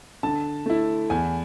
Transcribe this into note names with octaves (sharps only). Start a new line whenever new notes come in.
D3 A5
A3 E4
E2 G#5